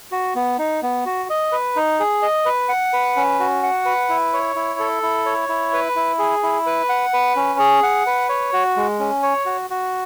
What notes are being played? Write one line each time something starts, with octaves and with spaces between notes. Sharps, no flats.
F#4
B3
D#4
B3
F#4
D#5
B4
D#4
G#4
D#5
B4
F#5
B4
C#4
F#4
F#5
B4
E4
C#5
E4
A4
E4
C#5
E4
B4
E4
G#4
E4
B4
F#5
B4
C#4
G#4
F#5
B4
C#5
F#4
G#3
C#4
C#5
F#4
F#4